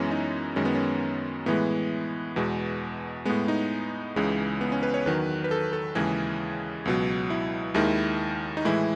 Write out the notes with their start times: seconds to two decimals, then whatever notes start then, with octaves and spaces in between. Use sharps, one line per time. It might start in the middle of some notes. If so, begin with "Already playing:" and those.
Already playing: F#2 E3 G#3 B3 C#4
0.11 D#4
0.56 F#2 D#3 G#3 C#4
0.65 B3
0.75 C#4
1.46 A2 E3 G#3 B3
2.36 E2 B2 G#3
3.25 A2 G#3 B3
3.48 D#4
4.16 C#2 C#3 E3 G#3
4.61 B3
4.72 C#4
4.83 B4
4.94 C#5
5.06 E2 D#3 F#3 B4
5.44 B4
5.51 A4
5.73 A4
5.95 D#2 C#3 E3 G#3 G#4
6.85 C#2 B2 F#3
7.30 E4
7.74 D#2 D#3 G#3 E4
8.57 D#4
8.65 A2 E3 G#3 E4